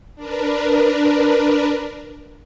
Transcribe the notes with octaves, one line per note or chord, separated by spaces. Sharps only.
D4 A#4 B4